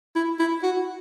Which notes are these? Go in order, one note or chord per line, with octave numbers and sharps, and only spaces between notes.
E4
E4
F#4